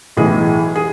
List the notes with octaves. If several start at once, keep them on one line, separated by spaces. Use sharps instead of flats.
B1 A2 E3 G#4
G#4